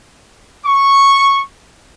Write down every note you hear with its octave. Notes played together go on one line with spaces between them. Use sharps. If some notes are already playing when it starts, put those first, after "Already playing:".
C#6